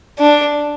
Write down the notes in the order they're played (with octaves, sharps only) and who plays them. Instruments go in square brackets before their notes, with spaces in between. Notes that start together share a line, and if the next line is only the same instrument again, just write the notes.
[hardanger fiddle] D4